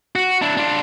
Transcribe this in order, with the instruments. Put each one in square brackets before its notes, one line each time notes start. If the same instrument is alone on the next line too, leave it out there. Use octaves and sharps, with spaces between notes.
[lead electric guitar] F#4
D4 E4
D4 F4